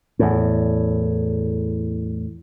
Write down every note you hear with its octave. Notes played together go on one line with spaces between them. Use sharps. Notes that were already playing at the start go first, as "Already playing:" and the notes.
E2 A2